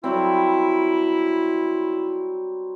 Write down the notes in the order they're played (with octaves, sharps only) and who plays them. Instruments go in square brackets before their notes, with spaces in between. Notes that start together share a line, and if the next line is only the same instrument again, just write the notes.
[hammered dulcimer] F#3 G3 C4 [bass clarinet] E4